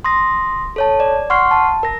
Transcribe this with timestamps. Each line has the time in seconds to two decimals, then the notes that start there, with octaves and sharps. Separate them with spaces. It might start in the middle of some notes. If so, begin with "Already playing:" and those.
0.04 C6 D#6 A#6
0.76 A4 C#5 A5
1.00 D5
1.30 F#5 C6 C#6 F6 C7
1.51 A5
1.83 A#4 A#6